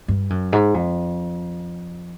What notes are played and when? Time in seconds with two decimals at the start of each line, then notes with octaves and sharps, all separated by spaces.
0.08 G2
0.30 F#2
0.53 G#2
0.74 F2